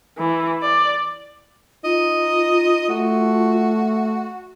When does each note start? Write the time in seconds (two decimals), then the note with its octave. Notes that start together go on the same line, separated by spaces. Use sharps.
0.18 E3
0.62 D5
1.84 D#4 F4 D#5
2.89 A3 F#4